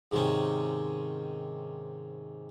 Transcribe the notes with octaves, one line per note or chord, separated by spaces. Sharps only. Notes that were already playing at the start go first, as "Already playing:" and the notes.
G#2 C3 D#3 C#4